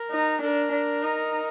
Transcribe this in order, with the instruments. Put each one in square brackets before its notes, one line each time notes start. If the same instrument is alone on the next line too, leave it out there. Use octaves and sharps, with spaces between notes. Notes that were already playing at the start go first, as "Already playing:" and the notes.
Already playing: [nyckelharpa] A#4
[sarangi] D#4
[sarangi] D4 [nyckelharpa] A#4
[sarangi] D4
D#4